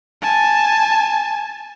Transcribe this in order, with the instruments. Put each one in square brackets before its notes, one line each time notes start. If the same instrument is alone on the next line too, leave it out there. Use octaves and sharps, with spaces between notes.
[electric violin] G#5 A5